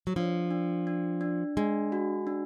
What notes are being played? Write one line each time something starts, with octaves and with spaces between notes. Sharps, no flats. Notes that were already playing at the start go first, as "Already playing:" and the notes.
F#3
F3 D4
D4
D4
D4
G#3 D4
F#4
D4